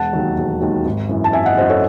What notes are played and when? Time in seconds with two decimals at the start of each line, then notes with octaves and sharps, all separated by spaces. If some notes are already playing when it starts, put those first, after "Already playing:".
Already playing: E1 F#5 A5
0.13 D#2 D#3 F#3
0.38 E1
0.61 D#2 D#3 F#3
0.85 G#1
1.09 F#2 E3
1.24 A5
1.33 G#1 E5 G#5
1.46 D#5 F#5
1.58 F#2 E3 C5 D#5
1.69 A4 C#5